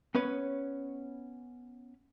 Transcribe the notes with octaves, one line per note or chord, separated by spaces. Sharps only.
B3 C#4 B4 C#5